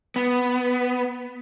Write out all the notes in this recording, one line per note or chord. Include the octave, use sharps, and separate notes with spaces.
B3